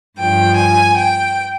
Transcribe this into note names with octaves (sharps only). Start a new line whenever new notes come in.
G2 F3 G5
G#5
G5